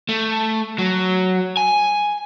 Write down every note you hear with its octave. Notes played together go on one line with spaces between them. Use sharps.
A3
F#3
G#5